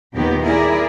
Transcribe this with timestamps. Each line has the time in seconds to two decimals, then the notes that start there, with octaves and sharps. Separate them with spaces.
0.14 D#2 A#2 D#3 B3 G4
0.44 E4 G#4 A#4 D5